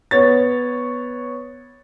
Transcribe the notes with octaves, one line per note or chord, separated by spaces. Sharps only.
B3 C#5 A6